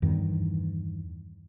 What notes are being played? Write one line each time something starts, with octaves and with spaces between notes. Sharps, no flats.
E2 G2 D#3